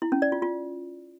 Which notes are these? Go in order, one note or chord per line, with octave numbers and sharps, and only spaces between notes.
E4
C#4
D5
F4
F4